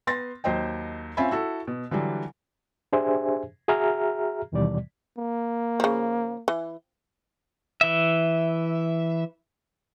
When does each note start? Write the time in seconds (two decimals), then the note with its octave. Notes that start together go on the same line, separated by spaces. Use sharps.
0.07 B3 C6 A6 A#6
0.44 D#2 F#3 C5 D#5 G5
1.17 C4 C#4 F4 E5 G#5 B5
1.31 E4 F#4 A4
1.67 B2
1.91 D3 E3 F#3 G3
2.93 D4 G4 G#4 C5 E5 G#5
3.68 F#4 G#4 E5 A#5 F6
4.52 D#2 B2 D#3 E3 G3 D5
5.18 A#3
5.80 C#3 F3
6.48 E3
7.81 E3 E5